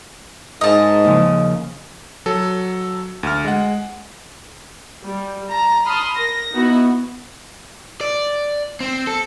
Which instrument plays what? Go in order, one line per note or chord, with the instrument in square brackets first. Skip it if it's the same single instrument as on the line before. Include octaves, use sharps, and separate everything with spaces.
[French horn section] G#2 [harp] A#4 [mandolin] D#5 A5
[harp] D#2 C#3 F3
[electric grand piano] F#3 A4
D2 F6
G#3 F#5
[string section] G3
A5 A#5
A5 B5 C6 D#6 F6
A#4 A#6
B3 D#4 E4 F#4
[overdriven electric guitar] D5
C4
A4